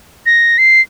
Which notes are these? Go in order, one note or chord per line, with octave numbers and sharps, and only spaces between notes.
A#6
C7